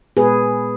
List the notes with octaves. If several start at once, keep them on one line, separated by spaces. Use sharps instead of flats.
A#2 G#3 B3 G#4 B4